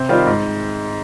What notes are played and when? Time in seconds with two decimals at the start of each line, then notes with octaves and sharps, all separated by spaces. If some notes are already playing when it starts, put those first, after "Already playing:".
Already playing: C3 C5
0.09 D#3 G3 C4 F4
0.26 G#2